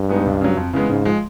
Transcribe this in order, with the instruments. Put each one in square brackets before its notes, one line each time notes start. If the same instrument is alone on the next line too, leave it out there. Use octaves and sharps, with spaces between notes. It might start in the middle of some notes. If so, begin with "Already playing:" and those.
Already playing: [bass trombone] G2
[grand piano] G#3 B3 D#4
C#2
C#3 F#3
F2
C#3 E3 G#3 B3
[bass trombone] G#2 [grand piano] C#3
[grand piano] F3 G#3